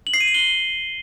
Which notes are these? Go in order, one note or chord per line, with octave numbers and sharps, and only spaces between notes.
F#7
C7
D#7
F#7
G7